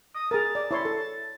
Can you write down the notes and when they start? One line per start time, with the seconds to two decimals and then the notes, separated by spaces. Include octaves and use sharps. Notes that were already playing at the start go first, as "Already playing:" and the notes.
0.15 D#6
0.31 G#4 A#4 A5
0.55 D5
0.71 E4 C#5 C6
0.85 A4